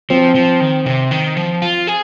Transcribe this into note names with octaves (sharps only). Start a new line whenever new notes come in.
F3 C4
F3
D#3
C3
D#3
F3
F4
G#4